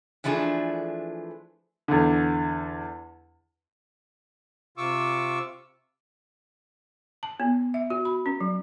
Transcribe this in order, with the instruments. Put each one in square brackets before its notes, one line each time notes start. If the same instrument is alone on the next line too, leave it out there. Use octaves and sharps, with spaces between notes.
[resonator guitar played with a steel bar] E3 F3 A3 D4 G#4
[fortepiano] E2 D3
[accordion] C3 F4 C#6 D6 E6
[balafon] A5
B3
E5
F#4
B5
C#4
F#3